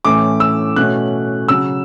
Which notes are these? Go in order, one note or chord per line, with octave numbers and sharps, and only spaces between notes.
A2 E3 A3 C#4 D6
E6
B2 A3 C#4 F#6
C#3 F#3 C#4 E6